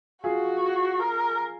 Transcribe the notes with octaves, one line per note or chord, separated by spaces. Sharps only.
F4 F#4 G#4
A#4